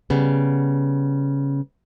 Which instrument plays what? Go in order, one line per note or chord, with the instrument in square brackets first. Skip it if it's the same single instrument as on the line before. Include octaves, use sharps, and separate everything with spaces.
[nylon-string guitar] C#3 G3 B3